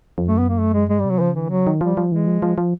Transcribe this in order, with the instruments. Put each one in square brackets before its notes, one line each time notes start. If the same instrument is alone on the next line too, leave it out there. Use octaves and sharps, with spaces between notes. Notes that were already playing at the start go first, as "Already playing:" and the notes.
[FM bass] F2
[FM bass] F#2 [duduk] A3
[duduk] B3
A#3
A3
G#3
[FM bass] G2 [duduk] G#3
[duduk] G3
[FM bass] C3 [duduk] F#3
[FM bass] C#3 [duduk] F3
[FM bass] D3 [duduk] E3
[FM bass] C#3 [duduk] F#3
[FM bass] D#3
[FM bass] F3 [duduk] G3
[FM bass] F3
[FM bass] E3 [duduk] G#3
[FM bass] F3
F3
F3